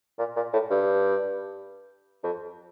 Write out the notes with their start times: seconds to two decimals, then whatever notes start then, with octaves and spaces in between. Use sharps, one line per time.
0.19 A#2
0.36 A#2
0.53 A2
0.70 G2
2.24 F2